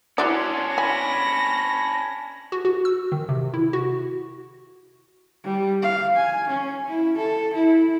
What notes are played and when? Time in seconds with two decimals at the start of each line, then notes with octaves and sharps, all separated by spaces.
0.18 C#4 D4 E4 F#4 D5 C6
0.78 G#5 B5 A#6
2.52 F#4
2.65 F#4
2.85 E6
3.12 D#3
3.29 C3
3.54 E4
3.73 F#4
5.44 G3
5.82 F5
6.16 G#5
6.49 C#4
6.88 E4
7.18 A4
7.54 E4